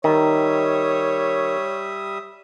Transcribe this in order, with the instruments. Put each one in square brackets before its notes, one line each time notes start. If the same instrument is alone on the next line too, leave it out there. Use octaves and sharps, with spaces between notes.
[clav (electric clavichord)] D#3 [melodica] G3 E5 D#6 [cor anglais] C#5